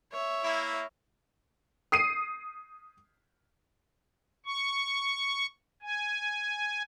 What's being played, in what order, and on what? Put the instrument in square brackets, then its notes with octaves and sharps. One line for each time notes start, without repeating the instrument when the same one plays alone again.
[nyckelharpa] C#5 E5
[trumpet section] A#3 E4
[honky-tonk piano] D#6 C7 D#7
[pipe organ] C#6
G#5